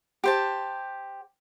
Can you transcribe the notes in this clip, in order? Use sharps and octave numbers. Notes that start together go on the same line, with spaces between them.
G4 C5 A5